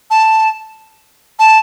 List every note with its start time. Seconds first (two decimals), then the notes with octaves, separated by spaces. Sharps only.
0.10 A5
1.39 A5